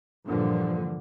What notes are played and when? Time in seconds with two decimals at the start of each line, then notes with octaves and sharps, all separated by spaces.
0.25 G2 A#2 D3 E3 F3